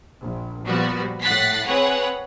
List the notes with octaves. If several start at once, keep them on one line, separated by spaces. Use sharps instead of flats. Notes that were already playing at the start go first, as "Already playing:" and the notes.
A#1
A#2 F3 G3 B3 F#4
A2 F#5 F#6 A6 B6 C7
C4 G#4 B4 C#5 F#5